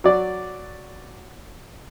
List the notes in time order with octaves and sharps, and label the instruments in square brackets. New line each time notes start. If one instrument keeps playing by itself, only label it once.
[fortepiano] F#3 D5